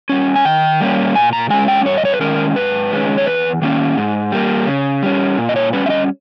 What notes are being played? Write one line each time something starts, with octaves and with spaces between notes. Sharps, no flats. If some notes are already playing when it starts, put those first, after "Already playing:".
G3 C#4
G#5
D#3 G5
G3 A#3 C#4
A#2 G#5
A#5
G#3 C#4 G#5
G5
G2 C#5
D#5
C#5
B4
D#3 G#3 C#4 A#4
G#2 B4
D#3 G#3 C#4
C#5
E2 B4
D#3 A#3 C#4
G#2
G3 A#3
C#3
G3 C#4
A#2
D#5
C#5
G3 C#4 B4
E5
D#5